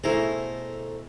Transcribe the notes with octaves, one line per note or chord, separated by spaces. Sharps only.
B2 A3 E4 G#4 C5 A#5